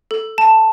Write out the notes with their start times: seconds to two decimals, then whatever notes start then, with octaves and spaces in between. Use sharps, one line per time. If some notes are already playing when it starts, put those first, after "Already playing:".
0.11 A4
0.38 A5